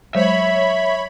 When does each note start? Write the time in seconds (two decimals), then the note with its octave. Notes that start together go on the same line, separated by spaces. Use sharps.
0.15 F#3 G#3 C5 C#5 E5 B5